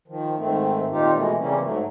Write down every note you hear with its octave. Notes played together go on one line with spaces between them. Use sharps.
D#3 F3
G#2 D#3 A3 C4
A#2 D#3 C4 D#4 F4 G4
B2 E3 G#3 A3
C#3 E3 G3 A#3 C4 C#4
G#2 F#3 A3